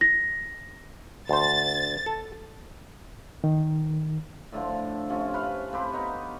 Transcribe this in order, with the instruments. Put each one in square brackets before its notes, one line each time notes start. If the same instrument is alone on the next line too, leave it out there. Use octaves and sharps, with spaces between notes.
[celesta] A#6
[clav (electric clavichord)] D2 C5 [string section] A6
[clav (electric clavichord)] A4
[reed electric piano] D#3
[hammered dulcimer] A2 D3 F3
C3 F3 C#4
B4 C#5 F5
C4 G4 B4
B3 D#4 C#5